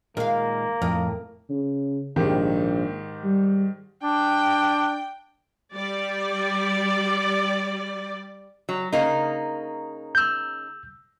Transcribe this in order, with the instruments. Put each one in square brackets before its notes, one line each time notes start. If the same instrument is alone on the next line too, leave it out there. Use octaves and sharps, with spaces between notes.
[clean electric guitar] A#2 D#3 G#3 [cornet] A#3 [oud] A#4 F5
[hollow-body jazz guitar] F2 [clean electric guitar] A2 [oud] A#4
[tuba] C#3
[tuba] A#1 [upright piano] G#2 D#3 G4
[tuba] G3
[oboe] D4 [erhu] G5
[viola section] G3 D5
[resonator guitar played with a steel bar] F#3
C#3 A#3 D#4
[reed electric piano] E6 G6